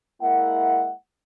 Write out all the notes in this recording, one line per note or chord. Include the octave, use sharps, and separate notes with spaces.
G#3 A#3 E4 E5 F#5